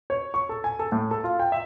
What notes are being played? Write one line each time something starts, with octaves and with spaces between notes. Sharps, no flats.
C#5
C#6
A4
G#5
A4
A2
A4
F4
G5
E5